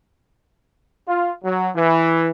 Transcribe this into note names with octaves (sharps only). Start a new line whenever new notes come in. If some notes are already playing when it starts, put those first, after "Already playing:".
F4
F#3
E3